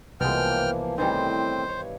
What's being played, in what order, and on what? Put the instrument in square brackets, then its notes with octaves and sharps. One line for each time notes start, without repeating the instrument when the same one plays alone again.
[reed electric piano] C2 [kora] B2 G#3 [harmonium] E3 F3 A#3 [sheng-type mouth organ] G5 F6
[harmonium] A2 C4 [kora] D#3 E3 G3 [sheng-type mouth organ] C5
[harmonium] G2 [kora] C#5